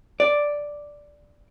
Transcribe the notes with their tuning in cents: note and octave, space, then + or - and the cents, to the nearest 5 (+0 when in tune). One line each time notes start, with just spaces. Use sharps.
D5 +0